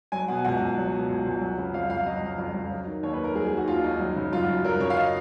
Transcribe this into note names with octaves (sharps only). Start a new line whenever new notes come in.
F#3 G#5
B2 F#5
C#2 F#5
C#2
F#3
B2
C#2
C#2
F#3
C#3
F2 F5
F2 F5
F#3 D#5
C#3
F2
F2
F#3
D#3
D#2 C#5
B4
D#2
A#4
F#3 G#4
G#4
D#3
F#4
D#2 F4
D#2 D#4
F#3
C#3
F#2 F4
F#4
F#2
F#3 A#4
C#3 C#5
F5
D#5